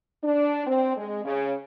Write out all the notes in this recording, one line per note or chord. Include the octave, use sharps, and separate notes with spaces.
D4
C4
G#3
C#3